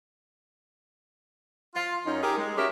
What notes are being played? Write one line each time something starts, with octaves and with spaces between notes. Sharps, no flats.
F4
F#2 C#4 D#4
D#4 G4 G#4 A#4
G#3
C#4 F#4 G4 A#4 E5